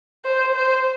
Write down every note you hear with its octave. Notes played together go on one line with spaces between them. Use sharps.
C5
C5